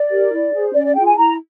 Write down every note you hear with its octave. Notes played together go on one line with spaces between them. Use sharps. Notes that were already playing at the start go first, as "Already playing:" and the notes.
Already playing: D5
G4 A#4
E4
G#4 C5
C#4 D5
D5
F4 G#4 G5
G#5
E4 A#5